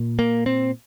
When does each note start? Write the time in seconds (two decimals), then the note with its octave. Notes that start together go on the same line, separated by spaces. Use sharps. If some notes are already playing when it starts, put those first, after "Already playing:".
Already playing: A#2
0.19 A#3
0.46 C4